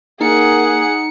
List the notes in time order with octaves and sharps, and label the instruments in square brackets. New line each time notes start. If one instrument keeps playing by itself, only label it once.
[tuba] A#3 [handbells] D#4 [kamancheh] G#4 F#5 [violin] C#7